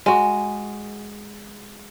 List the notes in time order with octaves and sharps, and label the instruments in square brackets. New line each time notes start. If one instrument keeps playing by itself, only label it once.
[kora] G#3 F#4